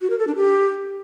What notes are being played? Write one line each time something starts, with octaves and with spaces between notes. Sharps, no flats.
F#4
A#4
A4
D4
G4